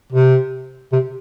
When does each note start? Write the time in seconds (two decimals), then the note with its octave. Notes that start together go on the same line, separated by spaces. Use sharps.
0.12 C3
0.92 C3